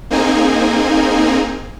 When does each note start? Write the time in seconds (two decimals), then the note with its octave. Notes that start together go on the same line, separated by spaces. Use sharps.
0.10 A#3 C4 D#4 G#4 G#5